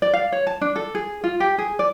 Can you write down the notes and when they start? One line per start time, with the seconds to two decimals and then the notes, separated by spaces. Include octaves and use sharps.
0.02 D5
0.14 F5
0.32 C#5
0.47 A5
0.61 D4
0.76 A4
0.95 G#4
1.24 F4
1.40 G4
1.58 G#4
1.79 D5